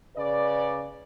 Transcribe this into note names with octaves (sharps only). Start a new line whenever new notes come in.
C#3 B4 D5